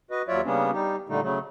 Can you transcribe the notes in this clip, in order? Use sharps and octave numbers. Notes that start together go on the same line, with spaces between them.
F#4 B4 D#5
D#2 F#3 F4 C#5 D5 E5
C#3 G3 A#3 B3 C#4 D4
G3 D#4 G4
A#2 D3 G3 A3 D#4
C#3 F#3 A3